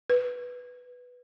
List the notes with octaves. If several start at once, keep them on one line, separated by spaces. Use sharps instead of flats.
B4